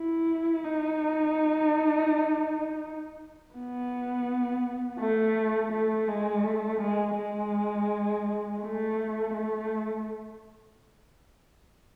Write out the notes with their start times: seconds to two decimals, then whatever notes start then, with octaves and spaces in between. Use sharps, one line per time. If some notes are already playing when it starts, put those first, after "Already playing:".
Already playing: E4
0.64 D#4
3.54 B3
4.99 A3
5.72 A3
6.08 G#3
6.44 A3
6.80 G#3
7.16 G#3
8.62 A3
9.34 A3